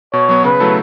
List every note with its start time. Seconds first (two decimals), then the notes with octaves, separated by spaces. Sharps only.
0.13 B2 C#5
0.29 F#3 B3
0.44 C#3 B4
0.60 F#3 A3 E4 A4